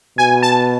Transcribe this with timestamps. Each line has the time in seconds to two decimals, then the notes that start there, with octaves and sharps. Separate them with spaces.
0.18 B2 G#5
0.43 A5